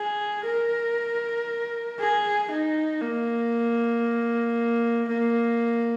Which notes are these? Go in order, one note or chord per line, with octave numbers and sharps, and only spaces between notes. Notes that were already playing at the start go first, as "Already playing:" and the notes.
Already playing: G#4
A#4
G#4
D#4
A#3
A#3